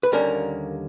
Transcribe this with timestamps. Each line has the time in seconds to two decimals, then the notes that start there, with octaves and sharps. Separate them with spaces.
0.03 B4
0.12 D#2 D3 G3 A#3 C#4 A#4